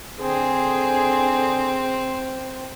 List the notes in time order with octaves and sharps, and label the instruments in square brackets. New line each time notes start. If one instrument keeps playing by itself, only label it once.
[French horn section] D3 G#4 [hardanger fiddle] C4